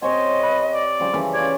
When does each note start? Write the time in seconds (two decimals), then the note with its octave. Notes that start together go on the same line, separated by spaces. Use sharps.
0.02 C3 C5 C#5 D#5 G#5
0.43 B4
0.74 D5
1.00 C#3 F3 G3
1.14 C#3 E3 B4
1.34 F4 C#5 D5 G#6